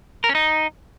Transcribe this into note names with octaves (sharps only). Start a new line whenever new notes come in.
A#4
C#4
D#4